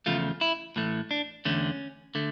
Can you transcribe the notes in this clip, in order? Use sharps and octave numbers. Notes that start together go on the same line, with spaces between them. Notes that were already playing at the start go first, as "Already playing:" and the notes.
E2 C#3 F3 A3 F4
E4
A2 E3 A3
D4
E2 D3 A3 C#4
D3 A3